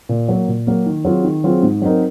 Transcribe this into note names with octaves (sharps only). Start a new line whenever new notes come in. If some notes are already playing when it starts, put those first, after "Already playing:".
A#2
F#3 A#3
A#2
F#3 A#3
D#3
F#3 C4 F4 G#4
D#3
F#3 C4 F4 G#4
G#2
F#3 C4 D#4 A#4